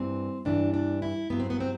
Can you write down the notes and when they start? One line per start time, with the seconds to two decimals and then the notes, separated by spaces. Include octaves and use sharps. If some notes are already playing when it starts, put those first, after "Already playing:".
Already playing: G2 E3 C4
0.45 G2 E3 D4
0.74 D4
1.02 E4
1.30 G2 F#3 B3
1.40 C4
1.50 B3
1.60 C4